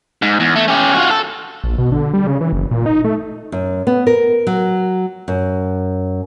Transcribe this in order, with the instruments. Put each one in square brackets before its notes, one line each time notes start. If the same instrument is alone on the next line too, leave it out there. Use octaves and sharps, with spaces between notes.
[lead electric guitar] G#2
E2
A3
C#4 G4
F4 F#4
A4
[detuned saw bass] A#1
B2
D3
G3
C#3
E3
F#1
A#2
D#4
A3
[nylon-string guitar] F#2
B3
A#4
F#3
F#2